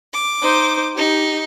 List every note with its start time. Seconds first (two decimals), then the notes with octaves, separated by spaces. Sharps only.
0.12 D6
0.42 D#4 C5
0.95 D#4 G4